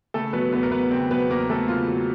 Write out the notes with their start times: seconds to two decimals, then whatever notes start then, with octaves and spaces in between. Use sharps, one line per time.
0.14 C#3 A3 A4
0.33 F#3 B3 B4
0.52 E2 B3 B4
0.63 A#4
0.72 B3 B4
0.91 C#3 C4 C5
1.11 F#3 B3 B4
1.30 E2 A#3 A#4
1.49 A3 B3 A4
1.68 C#3 F4
1.88 F#3